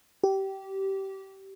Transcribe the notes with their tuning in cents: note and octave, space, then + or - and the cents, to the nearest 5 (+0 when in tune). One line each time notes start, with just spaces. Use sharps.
G4 -20